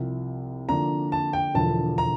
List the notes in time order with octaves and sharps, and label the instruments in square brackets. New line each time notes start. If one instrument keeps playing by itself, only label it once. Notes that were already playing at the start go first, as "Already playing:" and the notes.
Already playing: [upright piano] C2 C3 F3
[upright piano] D3 F3 A#3 D4 [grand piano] A#5
[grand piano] A5
G5
[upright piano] E1 E2 D3 F3 [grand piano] A5
[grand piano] A#5